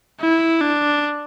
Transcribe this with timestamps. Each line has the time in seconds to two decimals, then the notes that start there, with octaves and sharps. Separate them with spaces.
0.20 E4
0.61 D4